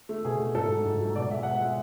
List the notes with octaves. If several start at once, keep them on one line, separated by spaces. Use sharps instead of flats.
A3
B2 G#4
A3
G#2 A4
F#3 A3
G#2
F#3 A3
B2 D5
G#3 E5
B2 F#5
E5
G#3